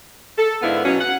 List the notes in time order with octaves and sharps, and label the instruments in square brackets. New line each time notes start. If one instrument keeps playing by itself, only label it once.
[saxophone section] A4
G#2 D3 B3 E4 F5
B2 F#3 C#4 F#4 C#5
F#5